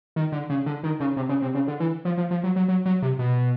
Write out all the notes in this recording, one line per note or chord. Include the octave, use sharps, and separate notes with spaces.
D#3
D3
C#3
D3
D#3
C#3
C3
C#3
C3
C#3
D3
E3
F3
F3
F3
F#3
F#3
F#3
F#3
C3
B2